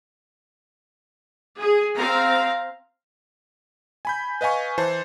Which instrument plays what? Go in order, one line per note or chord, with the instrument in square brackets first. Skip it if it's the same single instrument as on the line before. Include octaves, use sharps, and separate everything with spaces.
[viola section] G#4
C4 F5 A#5
[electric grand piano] G#5 B5 G6
B4 D#5 F5 G#5 C#6
E3 C5 A5